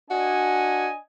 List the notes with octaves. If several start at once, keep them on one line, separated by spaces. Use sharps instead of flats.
D4 F#4 D#5 G#5